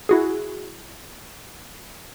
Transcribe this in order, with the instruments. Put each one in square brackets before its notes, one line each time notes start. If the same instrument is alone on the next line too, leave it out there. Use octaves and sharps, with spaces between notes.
[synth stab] E4 F#4 G#4